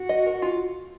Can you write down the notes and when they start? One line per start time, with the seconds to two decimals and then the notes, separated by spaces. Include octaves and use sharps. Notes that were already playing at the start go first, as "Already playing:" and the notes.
Already playing: F#4
0.09 D#5
0.26 A#4
0.42 F4